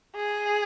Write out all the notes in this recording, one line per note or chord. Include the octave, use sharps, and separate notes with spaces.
G#4